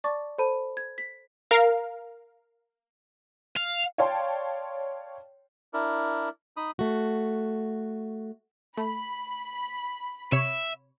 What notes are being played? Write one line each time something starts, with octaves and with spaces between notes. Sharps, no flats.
D5 A5 C#6 D6 A6
A4 C5 A5 B5 D#7
G#6
B6
A#4 F5
F5
C#5 D5 F5 G5 A5 C6
D4 E4 A#4
D#4 B5 D#6
A3 F#4
A3 B5
C3 C#5 E5